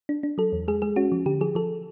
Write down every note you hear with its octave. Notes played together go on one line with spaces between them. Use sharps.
D4
D4
F#3 A4
E2
G#3 G#4
G#3 G#4
C#4 F#4
F3
D3 G4
F3 G#4
F3 A4